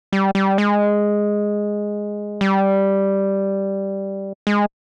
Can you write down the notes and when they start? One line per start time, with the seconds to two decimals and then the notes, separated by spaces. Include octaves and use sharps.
0.12 G3
0.35 G3
0.58 G#3
2.41 G3
4.47 G#3